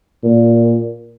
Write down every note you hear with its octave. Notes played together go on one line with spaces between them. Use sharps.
A#2